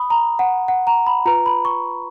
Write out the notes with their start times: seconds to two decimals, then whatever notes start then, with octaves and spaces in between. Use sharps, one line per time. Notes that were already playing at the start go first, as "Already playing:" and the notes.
Already playing: B5 D#6
0.10 A#5
0.39 F#5
0.68 F#5
0.87 A#5
1.07 B5
1.26 F4 B4 A#5
1.46 B5
1.65 C#6